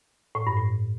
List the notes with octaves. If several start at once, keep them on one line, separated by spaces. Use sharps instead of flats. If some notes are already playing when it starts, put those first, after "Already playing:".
A2
G2
A2